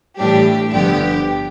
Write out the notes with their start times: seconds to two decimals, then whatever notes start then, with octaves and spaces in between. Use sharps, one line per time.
0.18 A2 E3 G3 D4 G4
0.73 G1 G2 D3 F3 B3 G4